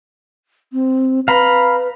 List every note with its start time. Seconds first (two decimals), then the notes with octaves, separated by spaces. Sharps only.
0.73 C4
1.28 B4 F5 A#5 B5